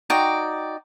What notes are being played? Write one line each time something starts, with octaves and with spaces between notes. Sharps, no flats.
D#4 F#4 D5 G5